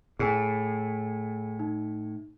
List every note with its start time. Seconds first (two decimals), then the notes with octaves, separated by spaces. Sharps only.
0.19 A2 G#4 G#5
1.59 D#4